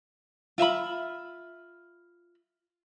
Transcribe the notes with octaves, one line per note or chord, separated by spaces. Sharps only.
F4 E5 F5 B5